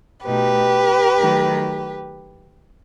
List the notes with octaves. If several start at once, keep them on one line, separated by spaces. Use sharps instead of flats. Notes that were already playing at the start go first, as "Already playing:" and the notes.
B2 A3 D#4 G4 B4
D#3 F#3 A3